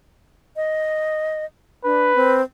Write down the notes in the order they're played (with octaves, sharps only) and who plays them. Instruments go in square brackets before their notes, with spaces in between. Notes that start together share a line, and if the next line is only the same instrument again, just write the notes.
[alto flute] D#5
[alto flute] D4 [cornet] B4
[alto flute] C4